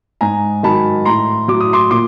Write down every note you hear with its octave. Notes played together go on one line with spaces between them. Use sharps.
G#2 G#5 A#5
D#3 F#3 A5 B5
A2 A#5 C6
F#3 D6
D#6
C6 D6
A#2 C6 D6